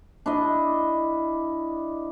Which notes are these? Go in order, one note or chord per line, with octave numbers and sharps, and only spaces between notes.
D4 E4 D#5